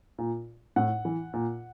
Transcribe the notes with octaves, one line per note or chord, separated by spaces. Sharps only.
A#2
A2 F#5
E3
A#2